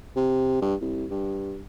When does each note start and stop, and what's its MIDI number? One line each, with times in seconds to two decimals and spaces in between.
0.16 0.58 48
0.62 0.75 43
0.81 1.05 36
1.10 1.61 43